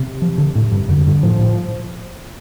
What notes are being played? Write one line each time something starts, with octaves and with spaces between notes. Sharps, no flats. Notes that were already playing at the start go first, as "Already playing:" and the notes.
Already playing: C3
F3
D3
A2
G2
F2 D3
G2
A2 F3
A2